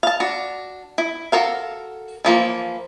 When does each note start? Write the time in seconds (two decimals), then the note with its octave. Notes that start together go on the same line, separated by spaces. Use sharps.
0.03 F5 A5
0.20 D4 F#4
0.98 E4
1.32 F#4 A4 A#4 F5
2.25 E3 F3 A#3